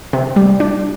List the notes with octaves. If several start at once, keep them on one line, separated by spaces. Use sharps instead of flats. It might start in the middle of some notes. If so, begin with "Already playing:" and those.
C3
G3
D4